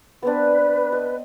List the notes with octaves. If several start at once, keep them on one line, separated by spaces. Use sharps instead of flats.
B3 C4 D4 B4
D#5